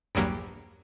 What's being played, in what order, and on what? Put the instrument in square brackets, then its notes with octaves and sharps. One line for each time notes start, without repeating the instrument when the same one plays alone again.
[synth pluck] A#1 E2 G2 F#3 G3 A#3